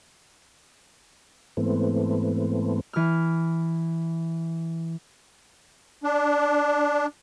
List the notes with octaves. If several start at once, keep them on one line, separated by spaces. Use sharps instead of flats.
G#2 E3 A3 B3 C4
E3 F6
D4